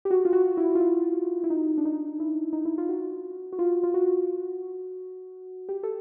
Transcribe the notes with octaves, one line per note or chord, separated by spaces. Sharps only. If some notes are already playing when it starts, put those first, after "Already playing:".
G4
F#4
F4
F#4
E4
F4
E4
E4
D#4
D4
D#4
E4
D#4
E4
F4
F#4
F#4
F4
F4
F#4
G4
A4